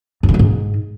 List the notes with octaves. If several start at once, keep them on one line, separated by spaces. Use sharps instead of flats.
F#2
D#3
F#3
G#2